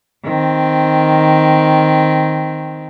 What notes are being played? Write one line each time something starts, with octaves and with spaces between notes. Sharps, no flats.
D#3 C4